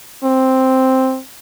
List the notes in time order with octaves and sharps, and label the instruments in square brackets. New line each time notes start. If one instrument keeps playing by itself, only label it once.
[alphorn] C4